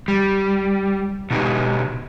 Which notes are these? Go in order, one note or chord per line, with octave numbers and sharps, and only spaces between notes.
G3
B2 D#4 G4